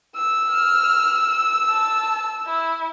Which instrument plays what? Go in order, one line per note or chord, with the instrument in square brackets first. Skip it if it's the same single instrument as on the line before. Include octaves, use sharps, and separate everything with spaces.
[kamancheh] E6
[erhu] F6
A5
E4